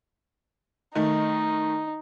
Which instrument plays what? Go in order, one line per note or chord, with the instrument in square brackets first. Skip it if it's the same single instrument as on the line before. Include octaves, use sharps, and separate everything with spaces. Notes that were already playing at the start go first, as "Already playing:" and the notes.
[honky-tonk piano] D#3 A3 [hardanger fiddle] D#4